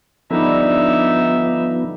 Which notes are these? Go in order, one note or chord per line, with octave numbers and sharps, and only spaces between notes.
D3 F3 G3 B3 D#4 E5